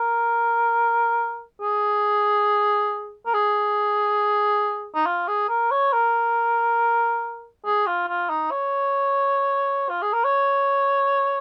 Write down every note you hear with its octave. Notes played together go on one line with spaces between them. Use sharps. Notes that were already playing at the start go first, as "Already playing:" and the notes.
Already playing: A#4
G#4
A#4
G#4
D#4
F4
G#4
A#4
C#5
A#4
G#4
F4
F4
D#4
C#5
F4
G#4
A#4
C#5